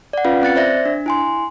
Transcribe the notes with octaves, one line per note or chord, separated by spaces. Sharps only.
D5 F#5
C#4 F4 B4 F5
C4 F#6 A6 C#7
C5 D5 E5 A#6
D4
E4 G#5 C6